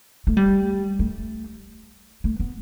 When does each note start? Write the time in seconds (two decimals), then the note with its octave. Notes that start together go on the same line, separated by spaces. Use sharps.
0.27 A3
0.37 G3
0.99 A3
2.24 A3
2.40 B3